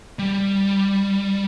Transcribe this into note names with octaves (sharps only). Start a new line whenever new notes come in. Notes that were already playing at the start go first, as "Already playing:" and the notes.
G3